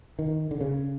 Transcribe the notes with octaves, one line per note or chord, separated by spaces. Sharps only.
D#3
D3
C#3